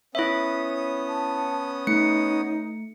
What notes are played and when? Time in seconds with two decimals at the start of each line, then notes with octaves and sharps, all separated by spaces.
0.15 B3 C#4 E4 E5 D#6
1.08 A5
1.87 A3 D#4 C#7